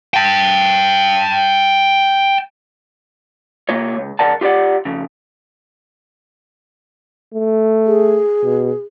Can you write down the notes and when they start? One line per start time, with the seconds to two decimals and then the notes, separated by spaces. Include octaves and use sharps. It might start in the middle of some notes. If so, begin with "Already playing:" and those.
0.14 G5 A5
3.69 C3 A#3 F4 C#5
3.97 C#2
4.19 C#2 C#3 A#4 D5 F#5 A5
4.41 F4 G4 C5 D5 F#5
4.85 F2 C#3
7.33 A3
7.86 G#4
8.44 B2